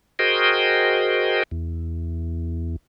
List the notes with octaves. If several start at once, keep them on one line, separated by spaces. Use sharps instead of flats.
F#4 G#4 A#4 C5 D#5 G5
E2